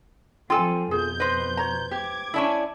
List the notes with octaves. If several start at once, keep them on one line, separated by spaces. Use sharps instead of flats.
F3 C4 F4 A4 G5 G#5
F2 B2 G#4 G6
B4 C5 D#5
C#5 A#5
G4 D6 G#6
C#4 D4 E4 E5 A5